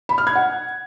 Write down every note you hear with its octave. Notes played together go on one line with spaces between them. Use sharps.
B5
F6
G#6
F#5